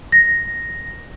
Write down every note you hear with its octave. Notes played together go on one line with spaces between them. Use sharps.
A#6